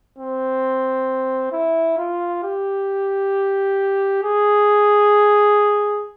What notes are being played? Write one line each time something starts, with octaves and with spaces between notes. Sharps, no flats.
C4
E4
F4
G4
G#4